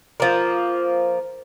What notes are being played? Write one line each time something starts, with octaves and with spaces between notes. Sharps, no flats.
F3 A#3